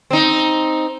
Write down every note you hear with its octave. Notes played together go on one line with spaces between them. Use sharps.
C4 D#4